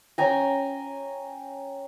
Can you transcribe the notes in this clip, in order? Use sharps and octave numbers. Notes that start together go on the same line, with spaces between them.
C#4 G5 G#5 A#5